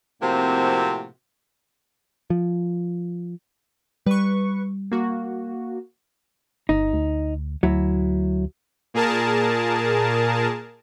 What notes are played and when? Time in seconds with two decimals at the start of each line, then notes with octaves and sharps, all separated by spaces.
0.22 A2 C3 F3 A#3 C4 F#4
2.30 F3
4.06 G3 B4 C#6
4.92 A#3 F#4
6.69 G1 D#4
6.93 D2
7.63 D2 F#3 E4
8.94 A#2 G#4 A#4 A5